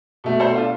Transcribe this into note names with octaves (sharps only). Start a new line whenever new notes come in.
B2 A3
A4 C5
D4 F4